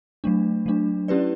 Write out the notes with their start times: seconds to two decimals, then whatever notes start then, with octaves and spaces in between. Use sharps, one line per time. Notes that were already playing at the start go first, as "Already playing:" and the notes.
0.24 F#3 A3 D4
0.66 F#3 A3 D4
1.08 C#4 E4 G4 B4 D5